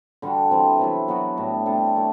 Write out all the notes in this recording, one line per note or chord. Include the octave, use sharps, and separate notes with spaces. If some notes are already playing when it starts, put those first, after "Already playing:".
D3 G3 D4 F#4
E3 G3 C4
C3 F#3 B3 E4
F#3 B3 F#4
A2 G3 D4
C3 G3 D4 A4
F#3 A3